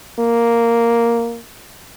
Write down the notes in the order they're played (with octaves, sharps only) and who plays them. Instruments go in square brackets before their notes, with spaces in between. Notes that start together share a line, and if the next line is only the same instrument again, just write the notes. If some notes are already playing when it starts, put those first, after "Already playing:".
[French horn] A#3